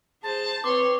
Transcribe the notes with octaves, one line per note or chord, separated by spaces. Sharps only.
G#4 C5 A5
C4 B4 C#5 C6 D6